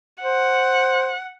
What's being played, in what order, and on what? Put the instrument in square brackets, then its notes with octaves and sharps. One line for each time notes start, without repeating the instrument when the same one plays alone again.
[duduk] C5 [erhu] F#5